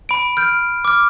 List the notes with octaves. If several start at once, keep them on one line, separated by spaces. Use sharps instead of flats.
B5 D7
F6 G6 D7
D6 F6